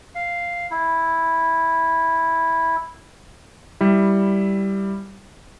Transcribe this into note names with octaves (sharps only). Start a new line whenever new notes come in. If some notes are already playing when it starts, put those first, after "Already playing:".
F5
E4
G3 E4